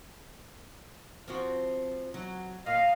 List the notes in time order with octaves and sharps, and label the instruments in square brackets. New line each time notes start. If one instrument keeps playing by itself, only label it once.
[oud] F3 C4 F#4
F#3
[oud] A#2 [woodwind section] D#5 F5